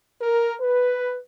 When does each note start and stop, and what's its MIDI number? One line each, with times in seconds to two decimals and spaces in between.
0.21 0.54 70
0.60 1.17 71